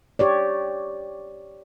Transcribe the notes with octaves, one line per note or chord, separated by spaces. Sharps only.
G4 C#5 D5